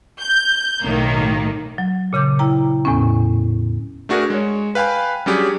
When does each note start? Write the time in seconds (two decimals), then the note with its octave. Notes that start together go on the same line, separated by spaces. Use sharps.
0.19 G6
0.83 B1 A2 D#3 A#3
1.78 F#3
2.13 A#2 C#3 D6 G6
2.39 E4 G5 A#5
2.85 E2 A2 B3 C#4
4.09 A3 D4 F#4 G#4 A#4
4.30 G#3 C#5
4.75 B4 F5 G5 G#5 B5
5.26 F#3 G3 C#4 D4 G4 G#4